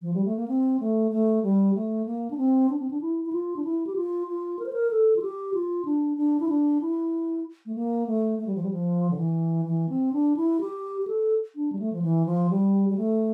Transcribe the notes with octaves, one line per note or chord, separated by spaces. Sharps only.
F3
G3
A3
A#3
C4
A3
A3
G3
A3
A#3
D4
C4
D4
C4
D4
E4
E4
F4
D4
E4
G4
F4
F4
A#4
C5
A#4
A4
F4
G4
F4
D4
D4
E4
D4
E4
A3
A#3
A3
A3
G3
F3
G3
F3
D3
E3
E3
C4
D4
E4
G4
G4
A4
D4
G3
A3
F3
E3
F3
G3
G3
A3